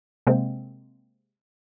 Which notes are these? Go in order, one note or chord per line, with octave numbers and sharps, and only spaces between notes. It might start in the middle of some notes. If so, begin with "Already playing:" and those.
C3 G#3 A#3 C4